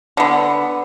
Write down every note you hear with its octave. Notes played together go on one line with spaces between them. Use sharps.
D3 B3